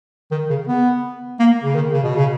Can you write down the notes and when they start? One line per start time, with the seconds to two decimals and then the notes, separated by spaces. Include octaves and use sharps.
0.31 D#3
0.50 C#3
0.68 B3
1.39 A#3
1.63 C#3
1.75 D#3
1.93 C#3
2.04 B2
2.16 C#3